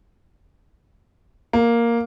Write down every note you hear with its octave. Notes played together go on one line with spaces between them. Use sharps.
A#3